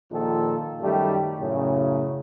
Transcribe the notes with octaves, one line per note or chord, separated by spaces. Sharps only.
A#1 A#2 D#3 F3 A4
F#2 D#3 G3 A3 G4
F#2 A2 C#3